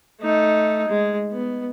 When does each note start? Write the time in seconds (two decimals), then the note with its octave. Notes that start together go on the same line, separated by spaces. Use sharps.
0.21 A3 D#4
0.88 G#3
1.32 B3